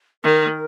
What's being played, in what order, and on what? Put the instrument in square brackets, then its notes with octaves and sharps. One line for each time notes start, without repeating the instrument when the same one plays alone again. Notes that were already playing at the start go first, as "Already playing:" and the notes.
[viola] D#3 [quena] A#4